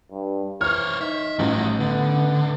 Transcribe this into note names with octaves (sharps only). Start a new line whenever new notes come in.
G2
E3 C5 C#5 F6
D#4 E5
A1 F3 F#4
D3 B3